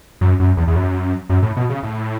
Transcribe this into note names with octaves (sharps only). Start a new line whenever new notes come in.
F#2
F#2
E2
E2
F#2
F#2
A2
B2
C#3
A2